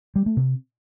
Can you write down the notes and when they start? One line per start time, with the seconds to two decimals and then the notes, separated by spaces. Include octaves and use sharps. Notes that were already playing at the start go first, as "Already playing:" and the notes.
0.16 G3
0.26 A3
0.37 C3